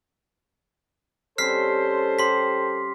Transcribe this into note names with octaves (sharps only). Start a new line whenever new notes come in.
G3 C4 C#4 A4 C5 F6 B6 C7
G4 C6 B6